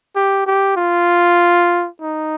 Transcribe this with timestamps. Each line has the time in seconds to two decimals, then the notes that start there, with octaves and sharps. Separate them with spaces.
0.16 G4
0.46 G4
0.77 F4
2.01 D#4